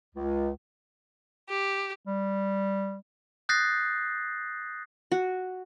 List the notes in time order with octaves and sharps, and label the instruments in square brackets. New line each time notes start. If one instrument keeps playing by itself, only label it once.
[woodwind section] C#2
[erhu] G4
[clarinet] G3
[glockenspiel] D#6 F#6 G6 A6 A#6 C7
[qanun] F#4